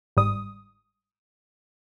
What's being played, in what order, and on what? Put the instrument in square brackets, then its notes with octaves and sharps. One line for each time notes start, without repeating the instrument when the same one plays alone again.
[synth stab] G1 G#2 G3 D#6